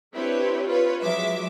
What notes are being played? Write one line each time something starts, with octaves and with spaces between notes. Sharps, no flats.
C4 D4 E4 G4 B4 C#5
F4 B4 C#5
F#3 G#3 E5 D6